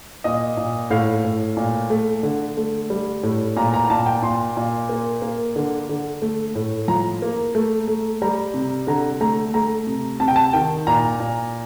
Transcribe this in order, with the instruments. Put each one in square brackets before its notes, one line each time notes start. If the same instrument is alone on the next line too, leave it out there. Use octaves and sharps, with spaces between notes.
[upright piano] A#2 D#5
A#2
A2 F5
A2
A#2
A3
D3
A3
G3
A2
A#2 A#5
A#5
A#5
A#2 A5
G5
A#2 C6
A#2
A#3
A#3
D3
D3
A3
A2
F3 A#5
A#3
A3
A3
G3 A#5
C3
D3 A#5
A3 A#5
A3 A#5
C3
C3 A5
G5
A5
D#3 G5
A#2 A#5
A#2